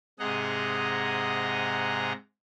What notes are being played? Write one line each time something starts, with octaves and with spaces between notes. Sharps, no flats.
G#2 C3 G#4 D#5 F#5 A#5